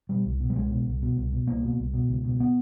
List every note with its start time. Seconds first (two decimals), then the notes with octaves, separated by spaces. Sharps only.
0.09 B2 G3
0.25 C2
0.40 B2
0.50 G3
0.56 C2 G#3
0.71 B2
0.87 C2
1.02 B2
1.17 C2
1.32 B2
1.47 C2 A#3
1.63 B2
1.78 C2
1.94 B2
2.08 C#2
2.24 B2
2.40 B3